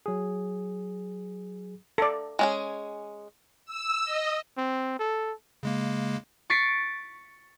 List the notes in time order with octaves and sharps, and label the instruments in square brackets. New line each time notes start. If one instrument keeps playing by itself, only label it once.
[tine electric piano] F#3 G#4
[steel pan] A4 D5
[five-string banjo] G#3 C#4 G#4
[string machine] E6
D#5
[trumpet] C4
A4
[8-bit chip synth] C#3 G#3 A#3
[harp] C#6 A6 B6 C7 D7